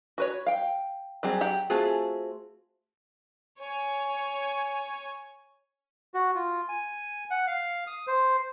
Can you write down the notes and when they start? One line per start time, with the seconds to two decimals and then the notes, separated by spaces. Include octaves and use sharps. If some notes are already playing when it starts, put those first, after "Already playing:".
0.18 F#4 B4 C#5
0.46 F5 G5
1.23 F#3 G3 C4 G#4
1.41 F#3 G4 F#5
1.70 A3 C4 F4 F#4 G#4
3.59 C#5 G#5
6.14 F#4
6.35 F4
6.69 G#5
7.30 F#5
7.47 F5
7.87 D#6
8.07 C5